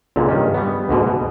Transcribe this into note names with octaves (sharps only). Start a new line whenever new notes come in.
C#2 A#2 D3
G2 D#3 C#4
G3 B3
D2 G#2 B2 D3
B2